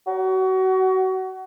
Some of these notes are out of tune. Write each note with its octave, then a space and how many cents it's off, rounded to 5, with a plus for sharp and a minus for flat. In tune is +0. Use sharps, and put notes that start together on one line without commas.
F#4 +30